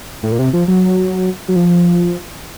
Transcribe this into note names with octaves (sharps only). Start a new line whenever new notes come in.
A2
A#2
C3
F3
F#3
F#3
F3